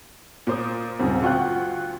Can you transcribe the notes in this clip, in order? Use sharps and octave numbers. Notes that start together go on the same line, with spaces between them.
A#2 C5 D#6
D#1 G#2 C#3 C4
D2 F4 F#5 G5 C#6 F#6